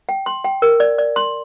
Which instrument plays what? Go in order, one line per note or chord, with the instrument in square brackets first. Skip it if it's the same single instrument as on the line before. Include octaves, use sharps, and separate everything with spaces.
[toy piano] G5
C6
G5
A#4
D5
D5
C6